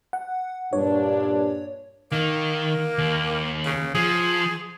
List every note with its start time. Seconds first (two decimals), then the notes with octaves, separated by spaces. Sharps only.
0.13 F#5
0.73 G2 A#2 D4 C#5
2.12 D#3 A#3
2.98 D#2
3.65 C#3
3.95 F3 G#4